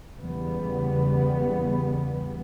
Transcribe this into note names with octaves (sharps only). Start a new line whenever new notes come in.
E2 C#3 G3 B3